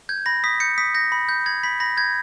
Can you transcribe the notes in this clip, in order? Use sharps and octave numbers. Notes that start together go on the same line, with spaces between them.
G6 G#6
B5 A#6
D#6 B6
G6 C#7
D#6 B6
G6 A#6
B5
G6
B5 G#6
B5 B6
B5 A#6
G6 G#6